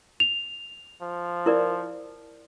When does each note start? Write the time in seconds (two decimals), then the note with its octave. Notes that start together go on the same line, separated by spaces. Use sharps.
0.20 F7
1.02 F3
1.46 E4 A#4 D5